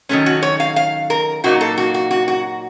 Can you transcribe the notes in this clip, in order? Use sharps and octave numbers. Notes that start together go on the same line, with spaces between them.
D#3 F#3 A3 C#4
F#4
C#5
F5
F5
A#4
A#2 F#3 A#3 D#4 F#4
A4
F#4
F#4
F#4
F#4